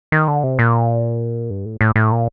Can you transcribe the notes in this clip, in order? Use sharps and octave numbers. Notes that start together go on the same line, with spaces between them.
D#3
D3
C3
A#2
G2
A2
A2
A2
A#2